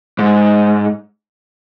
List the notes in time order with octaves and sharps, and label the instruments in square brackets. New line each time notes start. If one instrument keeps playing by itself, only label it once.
[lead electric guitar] G#2